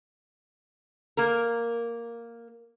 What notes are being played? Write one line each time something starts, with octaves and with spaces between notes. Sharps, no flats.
A#3 A#4